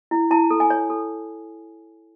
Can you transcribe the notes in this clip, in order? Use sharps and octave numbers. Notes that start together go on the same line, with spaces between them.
E4
E4 A5
A4
G#5
C#5
A4